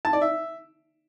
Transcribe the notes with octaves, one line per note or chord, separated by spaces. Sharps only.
A5
D5
E5